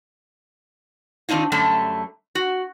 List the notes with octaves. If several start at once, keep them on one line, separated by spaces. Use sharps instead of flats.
D#3 C4 D4 D#4 F4
F#2 D3 G3 A3 E5 A5
F#4